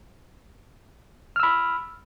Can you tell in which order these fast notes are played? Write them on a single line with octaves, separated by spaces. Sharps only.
F6 E6 B5